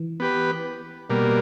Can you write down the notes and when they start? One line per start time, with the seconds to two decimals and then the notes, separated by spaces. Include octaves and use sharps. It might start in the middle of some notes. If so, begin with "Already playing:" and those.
Already playing: E3
0.20 B3 G4 B4
1.10 B2 G3 A#3